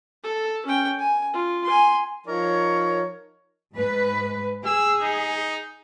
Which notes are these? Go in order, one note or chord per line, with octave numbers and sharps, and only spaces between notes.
A4
C#4 G5
G#5
F4
G#5 C6
F3 D#4 A#4 C#5
G#2 B4
G#4 E6
D#4